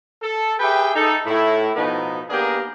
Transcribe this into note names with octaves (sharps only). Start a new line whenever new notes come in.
A4
G4 G#4 B4 E5 G5
D#4 A4
A2 E4
B2 F3 B3 D#4
A#3 B3 D4 G4 G#4 A#4